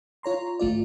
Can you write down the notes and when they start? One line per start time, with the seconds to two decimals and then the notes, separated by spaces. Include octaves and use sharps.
0.23 F4 C#5 A#5 C6
0.59 G#1 A3 F4 D5